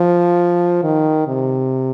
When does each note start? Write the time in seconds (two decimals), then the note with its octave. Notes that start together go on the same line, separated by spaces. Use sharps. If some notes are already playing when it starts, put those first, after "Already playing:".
Already playing: F3
0.83 D#3
1.27 C3